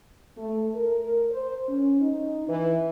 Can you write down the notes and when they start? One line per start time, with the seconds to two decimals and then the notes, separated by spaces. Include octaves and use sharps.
0.37 A3
0.73 A#4
1.30 C5
1.68 C#4
2.00 D#4
2.47 E3